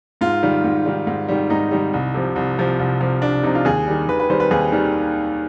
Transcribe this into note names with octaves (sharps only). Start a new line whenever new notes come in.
G#2 F4
D#3 G3
G#2
D#3 G3
G#2
D#3 G3
G#2 D#4
D#3 G3
C2
C3 F3
C2
C3 F3
C2
C3 F3
C2 D4
C3 F3 D#4
F4
D#2 G#4
D#3 G3
D#2 B4
B4
D#3 G3 C5
B4
D#2 G#4
D#3 G3